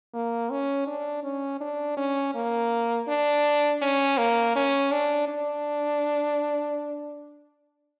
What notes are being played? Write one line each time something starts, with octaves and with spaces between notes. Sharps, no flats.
A#3
C#4
D4
C#4
D4
C#4
A#3
D4
C#4
A#3
C#4
D4
D4